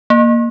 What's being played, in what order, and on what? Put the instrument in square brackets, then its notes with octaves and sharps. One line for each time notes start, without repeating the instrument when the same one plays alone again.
[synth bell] A#3